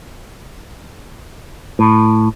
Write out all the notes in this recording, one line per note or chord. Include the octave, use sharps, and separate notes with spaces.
A2